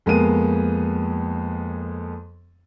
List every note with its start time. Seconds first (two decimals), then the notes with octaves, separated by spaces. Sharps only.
0.06 F2 G#3 A#3 B3 D#7